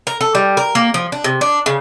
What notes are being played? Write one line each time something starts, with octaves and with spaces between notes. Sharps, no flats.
A#4
A4
G3
A#4
A#3
F3
D4
C3
D4
C#3